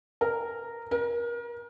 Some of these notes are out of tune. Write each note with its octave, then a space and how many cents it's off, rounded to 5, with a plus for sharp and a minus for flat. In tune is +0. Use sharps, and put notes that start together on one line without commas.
A#4 -10
A#4 +30